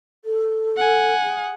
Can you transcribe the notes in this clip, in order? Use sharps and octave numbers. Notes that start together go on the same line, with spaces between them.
A4
F#5 G#5
G#4